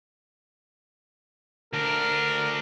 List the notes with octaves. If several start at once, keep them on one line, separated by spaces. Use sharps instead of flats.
D2 D4 A#4